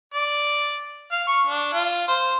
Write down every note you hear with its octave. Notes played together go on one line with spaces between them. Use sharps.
D5
F5
C#6
D4
F4
C5